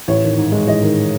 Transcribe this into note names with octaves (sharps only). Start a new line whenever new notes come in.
A1 C#5
D#3
G#2
G#3
A1 D#5
D#3